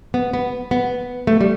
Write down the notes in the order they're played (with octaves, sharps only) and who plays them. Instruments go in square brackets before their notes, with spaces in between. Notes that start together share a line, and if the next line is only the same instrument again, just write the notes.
[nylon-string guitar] B3
B3
B3
A3
G3